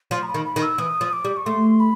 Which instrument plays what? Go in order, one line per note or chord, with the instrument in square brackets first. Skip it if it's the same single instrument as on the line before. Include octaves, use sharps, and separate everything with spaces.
[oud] F3 [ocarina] C6
[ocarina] A#5
B5
[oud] D#3
[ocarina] B5
[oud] D#3
[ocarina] E6
[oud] E3 [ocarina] D#6
[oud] F3
[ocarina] D6
[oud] G3
[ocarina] C#6
[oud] A3 [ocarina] C6
[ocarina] B5